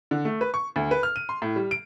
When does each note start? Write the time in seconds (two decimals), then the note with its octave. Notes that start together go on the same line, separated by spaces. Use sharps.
0.11 D3
0.25 A3
0.41 B4
0.54 C#6
0.76 D2
0.91 B4
1.03 F6
1.16 D#7
1.29 C6
1.42 A2
1.56 G3
1.71 D7